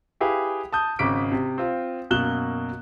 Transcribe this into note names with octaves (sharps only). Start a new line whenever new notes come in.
E4 G4 G#4 B4 F5
A5 D#6 G6
G#1 C#3 D6 B6 D7
C3
C4 F4
F#2 B2 A#3 F#6 E7 G7